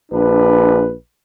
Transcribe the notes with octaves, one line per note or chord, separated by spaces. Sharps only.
A#1 D4 B4